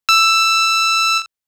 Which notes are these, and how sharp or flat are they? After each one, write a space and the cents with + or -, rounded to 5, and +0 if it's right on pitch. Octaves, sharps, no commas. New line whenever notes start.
E6 +10